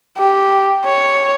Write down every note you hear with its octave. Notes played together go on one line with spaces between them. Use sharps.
G4
C#5